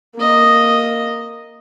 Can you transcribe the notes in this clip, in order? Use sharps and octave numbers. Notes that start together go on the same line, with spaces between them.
A#3 D#5